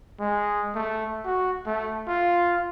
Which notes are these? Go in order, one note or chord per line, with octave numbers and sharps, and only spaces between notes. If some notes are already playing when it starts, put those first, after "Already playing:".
G#3
A3
F#4
A3
F4